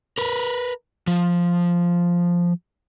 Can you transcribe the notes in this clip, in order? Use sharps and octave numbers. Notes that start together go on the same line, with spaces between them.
A#4 B4
F3